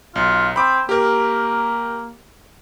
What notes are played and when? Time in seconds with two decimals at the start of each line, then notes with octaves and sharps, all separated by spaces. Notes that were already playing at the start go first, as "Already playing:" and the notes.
0.16 B1 F4
0.56 C4 B5 D6
0.89 A#3 G4 A#4